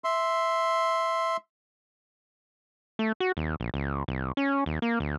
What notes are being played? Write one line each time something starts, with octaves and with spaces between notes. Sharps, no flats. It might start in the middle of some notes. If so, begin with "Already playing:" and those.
E5 C6
A3
F#4
D#2
A#1
C#2
C2
C#4
D#2
A#3
D2